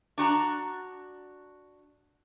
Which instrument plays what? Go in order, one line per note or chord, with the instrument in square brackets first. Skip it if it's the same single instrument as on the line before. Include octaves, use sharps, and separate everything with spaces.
[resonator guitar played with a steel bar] D4 F#4 A#5